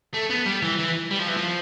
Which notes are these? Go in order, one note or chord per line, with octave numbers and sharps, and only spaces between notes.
A3
B3
G3
E3
E3
G3
F3
E3
F3